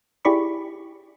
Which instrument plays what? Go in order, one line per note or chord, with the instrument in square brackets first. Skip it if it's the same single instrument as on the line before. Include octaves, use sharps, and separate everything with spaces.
[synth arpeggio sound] E4 G4 G#4 D5 B5 C#6